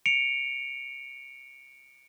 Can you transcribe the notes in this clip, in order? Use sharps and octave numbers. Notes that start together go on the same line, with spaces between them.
C#7 D7 F7